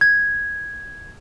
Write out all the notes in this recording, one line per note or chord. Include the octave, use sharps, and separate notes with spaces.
G#6